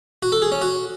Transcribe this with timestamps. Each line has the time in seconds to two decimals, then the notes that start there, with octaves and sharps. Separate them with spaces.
0.23 F#4
0.32 A4
0.42 G#4
0.52 C#4
0.62 F#4